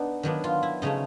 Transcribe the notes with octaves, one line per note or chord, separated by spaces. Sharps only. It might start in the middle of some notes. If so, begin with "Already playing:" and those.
Already playing: B3 D4 D#4
D#3 F#3 B3 D4
F4
E4
C#3 F3 A3 C#4 D#4